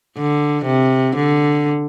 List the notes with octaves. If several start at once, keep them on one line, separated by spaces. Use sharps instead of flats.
D3
C3
D3